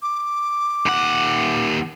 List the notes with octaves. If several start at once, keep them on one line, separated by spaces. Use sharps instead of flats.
D6
D#2 F#5